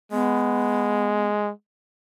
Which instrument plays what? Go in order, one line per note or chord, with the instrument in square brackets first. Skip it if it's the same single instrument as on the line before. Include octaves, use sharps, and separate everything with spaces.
[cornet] G#3 [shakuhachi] B3